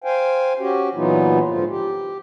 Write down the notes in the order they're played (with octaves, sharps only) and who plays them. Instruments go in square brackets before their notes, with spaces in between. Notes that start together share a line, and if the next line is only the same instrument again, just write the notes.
[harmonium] C5 F5 G5 G#5
C#4 F#4 G4
A#2 E3 F#3 B3 D#4 F4
G#2 D3 F3 F4
G4